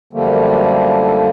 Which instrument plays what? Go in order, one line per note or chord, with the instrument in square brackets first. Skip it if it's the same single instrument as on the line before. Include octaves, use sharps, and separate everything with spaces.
[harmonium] F#2 D3 F3 G3 A3 A#3